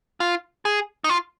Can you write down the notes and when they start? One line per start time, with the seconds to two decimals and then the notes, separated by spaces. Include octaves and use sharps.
0.20 F4
0.65 G#4
1.04 D#4
1.09 F4